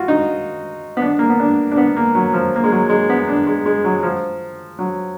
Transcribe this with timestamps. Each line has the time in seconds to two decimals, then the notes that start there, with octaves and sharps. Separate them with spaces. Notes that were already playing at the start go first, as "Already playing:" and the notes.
Already playing: F4 F#4
0.08 D#4
0.97 B3
1.02 D4
1.19 A#3
1.29 B3
1.40 D4
1.71 D4
1.77 B3
1.96 A#3
2.15 F#3
2.34 F3
2.56 A#3
2.64 G#3
2.71 F#3
2.90 G#3
3.09 B3
3.28 D4
3.47 G#3
3.66 G#3
3.84 F#3
4.03 F3
4.79 F#3